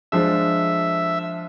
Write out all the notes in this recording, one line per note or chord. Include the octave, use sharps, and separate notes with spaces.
F3 G#3 D4 E5